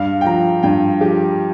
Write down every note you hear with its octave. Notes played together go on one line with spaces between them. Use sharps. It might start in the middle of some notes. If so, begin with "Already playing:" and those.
Already playing: G2 F5
G5
F3 A#5
G2 G5
F3 G4